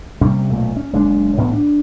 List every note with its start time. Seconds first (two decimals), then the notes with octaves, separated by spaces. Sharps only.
0.21 C3 G3 A#3 C#4
0.50 B1 A#2 A3
0.76 C#4
0.93 F#1 G#3 A#3 D4
1.37 A1 A2 B3 C#4
1.53 D4